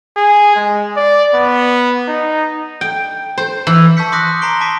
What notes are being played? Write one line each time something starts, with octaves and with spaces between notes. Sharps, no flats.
G#4
G#3
D5
B3
D#4
G5
C5
E3
A5 C#6 E6 G6 B6 C#7
C6 D6 D#6 F#6 A#6
A#5 C6 C7 D7 G7
A5 C6 D6 B6